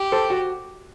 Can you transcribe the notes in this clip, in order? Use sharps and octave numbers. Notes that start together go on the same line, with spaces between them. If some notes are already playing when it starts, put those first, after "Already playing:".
Already playing: G4
A4 C5
F#4